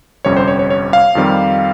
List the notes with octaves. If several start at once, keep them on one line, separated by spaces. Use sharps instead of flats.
G1 F2 C3 G3 C#4 C#5
C5
C#5
C#5
C#5
F5
F2 D#3 G3 C4